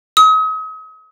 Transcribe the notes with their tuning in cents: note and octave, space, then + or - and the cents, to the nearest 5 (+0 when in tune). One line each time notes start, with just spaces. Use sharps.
D#6 +40